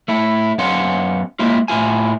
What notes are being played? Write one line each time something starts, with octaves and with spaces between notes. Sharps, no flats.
A3 E4
F#2 B3 C#4 F5 F#5 C6
G#3 A#3 E4 F4
A2 E4 F4 G#5